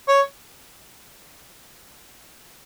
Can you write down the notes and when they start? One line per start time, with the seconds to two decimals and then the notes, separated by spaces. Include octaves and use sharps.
0.08 C#5